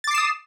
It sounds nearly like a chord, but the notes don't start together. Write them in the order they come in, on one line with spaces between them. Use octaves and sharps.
A6 D6 C7 E7 D#6